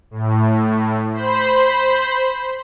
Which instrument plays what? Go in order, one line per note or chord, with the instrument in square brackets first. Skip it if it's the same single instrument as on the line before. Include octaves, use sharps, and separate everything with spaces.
[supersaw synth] A2
C5 B5